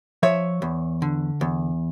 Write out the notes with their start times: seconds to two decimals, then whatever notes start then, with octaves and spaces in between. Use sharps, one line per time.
0.23 F3 C#5 E5
0.62 E2
1.02 D3
1.41 E2